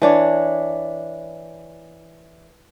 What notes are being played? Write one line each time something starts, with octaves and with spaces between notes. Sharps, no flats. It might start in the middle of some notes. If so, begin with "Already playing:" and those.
E3 D4 C#5